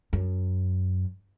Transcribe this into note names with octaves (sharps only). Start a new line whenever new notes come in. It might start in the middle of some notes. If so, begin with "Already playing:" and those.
F#2